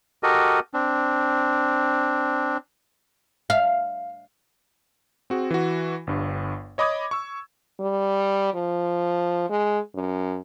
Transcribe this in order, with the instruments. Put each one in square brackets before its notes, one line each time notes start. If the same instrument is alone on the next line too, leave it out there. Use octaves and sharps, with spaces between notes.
[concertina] F#4 G4 A4 A#4 D#5
C4 D4
[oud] F5
[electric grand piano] C4 F#4 G#4
E3 F#4
G1 G2
C#5 D#5 B5 D6 D#6 G#6
C#6 E6
[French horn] G3
F3
G#3
F#2